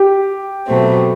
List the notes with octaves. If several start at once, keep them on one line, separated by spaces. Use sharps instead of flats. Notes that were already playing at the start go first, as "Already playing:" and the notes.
Already playing: G4
B2 F#3 A3 C4